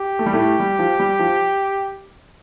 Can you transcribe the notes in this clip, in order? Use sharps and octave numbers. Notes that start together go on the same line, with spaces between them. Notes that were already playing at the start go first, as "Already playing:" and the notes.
Already playing: G4
A3
G3
A2 A3
G3
F3
G3
F3